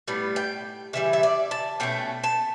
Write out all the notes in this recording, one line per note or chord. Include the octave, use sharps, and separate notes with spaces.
A2 G3 B3
G5
C#3 E3 G3 E5
E5
D5
A5
B2 A3 C#4 G5
A5